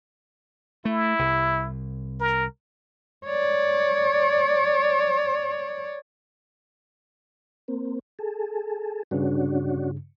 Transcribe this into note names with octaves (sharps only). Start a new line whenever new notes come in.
A3 E4
C2
A#4
C#5 D5
A#3 C4
G#4 A4
G2 C#3 C#4 D4 F#4